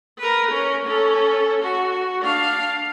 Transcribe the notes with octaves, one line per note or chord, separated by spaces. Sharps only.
A#4 B4
C#4 A#4
C#4 A4
F#4
D4 F5